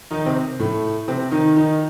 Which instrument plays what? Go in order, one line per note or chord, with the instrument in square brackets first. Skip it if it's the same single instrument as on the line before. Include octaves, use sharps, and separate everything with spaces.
[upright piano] D#3 D#4
C3 C4
A2 A3
C3 C4
D#3 D#4
D#3 D#4